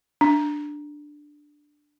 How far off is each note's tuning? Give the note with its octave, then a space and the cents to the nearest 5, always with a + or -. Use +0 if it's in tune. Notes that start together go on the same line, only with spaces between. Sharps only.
D4 +5